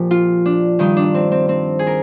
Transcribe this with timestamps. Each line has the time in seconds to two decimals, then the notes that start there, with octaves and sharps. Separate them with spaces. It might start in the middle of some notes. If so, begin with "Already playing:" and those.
Already playing: A#2 F3 G4
0.11 F4
0.46 D4
0.79 G2 D#3 D#4
0.97 D4
1.14 C4
1.31 C4
1.49 C4
1.79 G#4
1.87 A#4